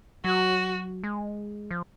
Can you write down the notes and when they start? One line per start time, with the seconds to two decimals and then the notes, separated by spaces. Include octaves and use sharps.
0.24 F#3 F#4
1.04 G#3
1.71 F3